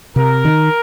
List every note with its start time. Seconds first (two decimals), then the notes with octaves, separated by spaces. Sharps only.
0.16 C3 A#4
0.45 D#3